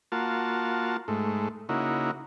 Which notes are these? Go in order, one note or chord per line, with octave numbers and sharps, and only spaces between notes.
A#3 F4 F#4 A5
G#2 A3
C#3 A#3 D#4 E4 F#4